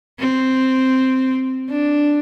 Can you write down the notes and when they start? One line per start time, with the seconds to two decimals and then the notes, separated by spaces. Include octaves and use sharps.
0.20 C4
1.70 D4